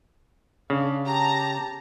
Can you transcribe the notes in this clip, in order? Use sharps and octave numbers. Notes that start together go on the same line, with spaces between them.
C#3 D4 F5
G4 A5 A#5